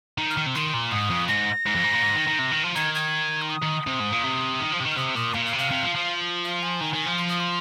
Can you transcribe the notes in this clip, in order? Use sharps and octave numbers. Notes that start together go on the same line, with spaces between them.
D#3
F6
D#3
C3
D#3 C6
A#2
G#2 D#6
F2
G#2 A#6
G#2
F2
G#2
A#2
G#2
D#3
D#3
C3
D#3
F3
D#3 G#6
G#6
C6
D#6
D#3
C3
G#2
A#2
C3
D#3
F3
C3
D#3
F6
C3 D#6
A#2 D#6
A#2 F5
F5
C3
F5
C3
F3
F3
F5
G#5
D#3
D#3
F3
C6
D#6
C6